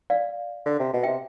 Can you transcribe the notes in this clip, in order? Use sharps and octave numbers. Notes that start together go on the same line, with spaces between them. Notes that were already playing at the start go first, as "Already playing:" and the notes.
D5 F5
D3
C3
B2
C3 E5 G5